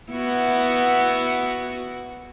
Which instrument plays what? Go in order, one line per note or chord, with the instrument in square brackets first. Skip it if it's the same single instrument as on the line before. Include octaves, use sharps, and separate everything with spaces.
[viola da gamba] B3 E4 F#4